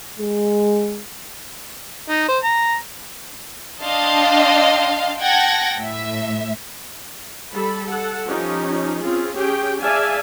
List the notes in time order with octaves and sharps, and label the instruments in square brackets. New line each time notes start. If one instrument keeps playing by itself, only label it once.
[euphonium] G#3
[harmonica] D#4
C5
A#5
[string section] D4 D#5 F5 G5 A5 C6
F#5 G5 A5 G#6 A#6
A2 E5
[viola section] G3 A4 B5
A4 F#5
F3 C#4 D#4 G4
C4 C#4 F4 G#4
C#4 G4 G#4 G5
G#4 D5 E5 F5 G#5 A5